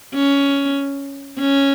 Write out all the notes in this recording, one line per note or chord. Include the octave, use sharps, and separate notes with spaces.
C#4
C#4